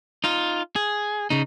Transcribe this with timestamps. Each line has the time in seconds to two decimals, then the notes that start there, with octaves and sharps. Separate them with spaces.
0.24 D#4 F4
0.76 G#4
1.30 C#3 D#4